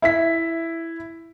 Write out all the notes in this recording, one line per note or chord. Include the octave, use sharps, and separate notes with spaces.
E4 E5 B6